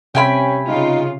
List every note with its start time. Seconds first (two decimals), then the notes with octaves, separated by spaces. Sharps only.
0.15 C3 C#4 E5 G5 G#5 B5
0.68 C#3 D#4 F4